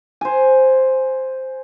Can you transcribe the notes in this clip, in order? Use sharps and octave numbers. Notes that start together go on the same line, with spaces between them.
C5 G#5